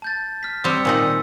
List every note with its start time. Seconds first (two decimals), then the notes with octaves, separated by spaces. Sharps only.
0.02 A5 G6 A6
0.43 F6 B6
0.64 G3 C4 D#6 E6 C#7
0.85 A#2 D#3 D#4 G#5 C6 E6